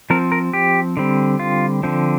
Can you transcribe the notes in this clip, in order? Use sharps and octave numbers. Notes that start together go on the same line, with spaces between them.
F3 C4 A#4
A#4
G4
D3 G3 C4
F4
D3 F3 C4